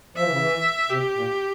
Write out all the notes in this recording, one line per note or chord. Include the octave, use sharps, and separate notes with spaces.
F3 E5
E3
C#3
E3
C3 G4
A#2